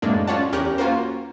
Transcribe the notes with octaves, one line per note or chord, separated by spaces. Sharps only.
F#2 A2 G#3 A#3 D4
C#4 F4 C#5 D5 F#5 A5
E2 C#4 G4 A#4 G5 F#6
A#3 C#4 F4 F#4 A#4 C5